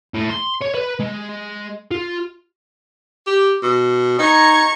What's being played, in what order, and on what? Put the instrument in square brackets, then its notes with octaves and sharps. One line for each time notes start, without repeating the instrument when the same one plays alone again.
[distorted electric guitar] A2
C6
C#5
B4
G#3
F4
[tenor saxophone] G4
B2
[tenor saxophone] D#4 [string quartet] A#5 C#6 G#6